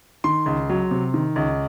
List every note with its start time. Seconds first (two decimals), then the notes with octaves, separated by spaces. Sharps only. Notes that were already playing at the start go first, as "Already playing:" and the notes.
0.24 D#3 C6
0.46 C#2
0.70 F#3
0.91 C3
1.14 D#3
1.36 C#2